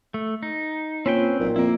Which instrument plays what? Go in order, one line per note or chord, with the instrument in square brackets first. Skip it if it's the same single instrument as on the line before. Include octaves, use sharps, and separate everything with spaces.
[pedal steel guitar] A3
D#4
[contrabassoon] A#2 [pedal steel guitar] C4 B4 G5 [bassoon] C#4
[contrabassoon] B1 [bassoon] A#2
[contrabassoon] F2 [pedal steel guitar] A#3 E4